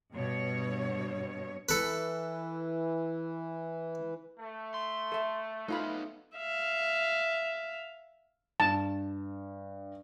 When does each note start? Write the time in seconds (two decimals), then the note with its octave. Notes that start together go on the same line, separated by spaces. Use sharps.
0.12 G2 B2 C#5
1.69 E3 A4 B4
4.39 A3
4.74 C6
5.12 A4 E5
5.68 A3 B3 D#4 F4 B4 F5 B5
6.37 E5 F5
8.60 G2 A5